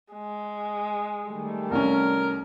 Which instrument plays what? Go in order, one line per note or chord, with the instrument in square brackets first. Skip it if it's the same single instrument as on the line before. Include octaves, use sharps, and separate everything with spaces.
[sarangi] G#3
[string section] D#3 G3 A3
[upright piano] C2 C#4 [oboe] A#4